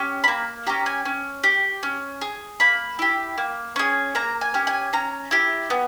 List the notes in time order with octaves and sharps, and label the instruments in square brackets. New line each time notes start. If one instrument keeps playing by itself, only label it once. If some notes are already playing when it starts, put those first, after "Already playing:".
Already playing: [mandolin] C#4 G4
B5
A#3 A#5
C#4 G4 A#5
G#5
C#4
G4
C#4
G#4
A#3 B5
E4 G4
A#3
C#4 G#4
A#3 A#5
G#5
C#4 G4
G#5
C#4 A#5
E4 G4
B3